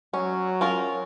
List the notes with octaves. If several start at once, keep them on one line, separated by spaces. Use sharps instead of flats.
F#3 C#4
C#4 F4 A#4